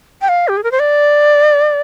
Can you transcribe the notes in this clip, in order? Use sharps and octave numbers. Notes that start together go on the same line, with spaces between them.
G5
F5
G4
G#4
A#4
C5
D5